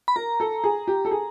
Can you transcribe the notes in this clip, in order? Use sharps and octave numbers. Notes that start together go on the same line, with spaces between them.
B5
A#4 A#5
A4
G#4
G4
A4
G#4